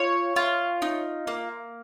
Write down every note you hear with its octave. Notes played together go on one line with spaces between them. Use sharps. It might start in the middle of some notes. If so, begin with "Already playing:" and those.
Already playing: F4 C#5
F4
D#4
A#3